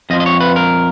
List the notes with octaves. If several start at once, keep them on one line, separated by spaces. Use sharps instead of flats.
F2 F3 D#5
D#5
C#5
B4
A#4